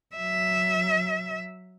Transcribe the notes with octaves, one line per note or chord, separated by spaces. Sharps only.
F#3 E5